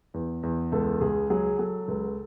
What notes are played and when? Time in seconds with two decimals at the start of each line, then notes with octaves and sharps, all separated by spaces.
0.14 E2
0.43 E2
0.72 C#2 A4
1.01 C#2 G#4
1.30 F#3 G#4
1.59 F#3 A4
1.88 C#2